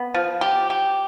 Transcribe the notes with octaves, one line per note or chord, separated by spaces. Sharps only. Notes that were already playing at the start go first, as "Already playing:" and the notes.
Already playing: B3
F3
G4
G4